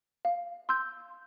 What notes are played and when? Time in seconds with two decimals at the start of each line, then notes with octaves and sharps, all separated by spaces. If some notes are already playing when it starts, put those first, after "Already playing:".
0.25 F5
0.69 C6 E6 G6